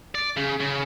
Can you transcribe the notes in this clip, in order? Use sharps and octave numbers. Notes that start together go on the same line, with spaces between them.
D5
C#3
C#3